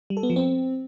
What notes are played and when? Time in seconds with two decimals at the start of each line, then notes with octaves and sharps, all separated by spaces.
0.10 G3
0.17 A4
0.23 B3
0.30 F3
0.36 C4